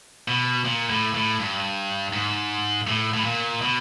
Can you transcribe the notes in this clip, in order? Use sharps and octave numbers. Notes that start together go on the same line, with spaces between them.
B2
A#2
A2
A2
G2
G#2
A2
A2
A#2
B2